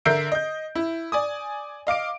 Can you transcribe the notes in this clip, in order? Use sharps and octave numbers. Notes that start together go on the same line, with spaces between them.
D3 A#4 E5 G6 C7 D7
D#5 G6
E4
D5 G#5 D#6
D#5 F5 D6 D7